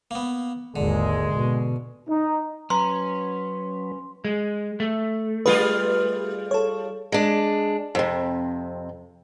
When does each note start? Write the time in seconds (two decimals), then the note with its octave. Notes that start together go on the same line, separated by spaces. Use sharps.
0.11 A#3 B3
0.76 G#1 D#2 D3 G#3
1.33 B2
2.10 D#4
2.70 F#3 C#4 B4 A#5 C6
4.25 G#3
4.80 A3
5.46 G3 F4 G#4 B4
6.51 A4 C#5
7.12 G#3 D4
7.95 F2 C3